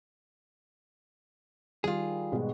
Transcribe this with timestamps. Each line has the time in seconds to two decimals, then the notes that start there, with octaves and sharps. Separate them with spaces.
1.84 D#3 G3 F4 G#4
2.32 G#2 B2 G#3 A#3 F#4